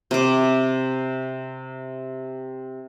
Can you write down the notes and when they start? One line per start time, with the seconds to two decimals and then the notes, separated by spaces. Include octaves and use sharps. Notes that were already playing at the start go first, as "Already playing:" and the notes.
0.11 C3 D6